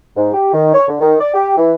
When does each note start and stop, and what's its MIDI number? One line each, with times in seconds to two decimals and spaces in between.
0.15 0.31 44
0.33 0.50 67
0.53 0.73 51
0.74 0.84 73
0.88 1.00 50
1.01 1.15 51
1.20 1.33 74
1.34 1.56 67
1.57 1.73 52